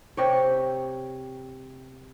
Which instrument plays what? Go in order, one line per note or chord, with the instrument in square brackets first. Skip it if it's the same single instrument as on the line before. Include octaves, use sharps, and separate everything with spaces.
[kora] C3 G4 C#5